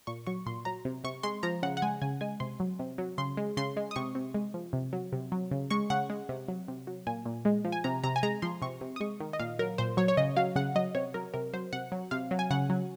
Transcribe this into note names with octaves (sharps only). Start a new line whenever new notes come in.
A#2 C#6
F#3 C#6
A#2 C6
F#3 A#5
C3
C3 C#6
G#3 C6
F3 A#5
C#3 F#5
F#5
G#3 G#5
C#3 G#5
G#3 G#5
C3 C6
F#3
C3
F#3
C#3 C6
G#3
C#3 C6
G#3
D#6
C3 C#6
C3
G#3
F3
C3
F#3
C3
F#3
C#3
G#3 C#6
C#3 F#5
G#3
C3
F#3
C3
F#3
A#2 G#5
A#2
G#3
F3
G#5
C3 A#5
C3 A#5
G#5
G#3 A#5
F3 C6
C3 C#6
C3
D#6
G#3 C#6
D#3
D#5
A#2 F5
F#3 A#4
A#2 C5
F#3 C#5
C#5
C#3 D#5
F#3 F5
C#3 F#5
F#3 D#5
C3 C#5
F#3 A#4
C3 A#4
F#3 C5
C3 F#5
F#3
C3 F5
F#3
G#5
C#3 F#5
F#3